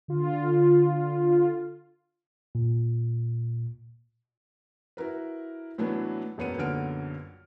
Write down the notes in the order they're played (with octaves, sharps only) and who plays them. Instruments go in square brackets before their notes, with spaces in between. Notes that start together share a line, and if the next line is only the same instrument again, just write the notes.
[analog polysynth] D3 F4
[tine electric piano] A#2
[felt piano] E4 F#4 A#4 B4
A2 E3 F#3 A3 B3 D4
E1 F#2 B3 C#7 D#7
A#1 F#2 D3 B3 F6 D7